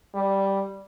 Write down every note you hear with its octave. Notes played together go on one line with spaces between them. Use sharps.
G3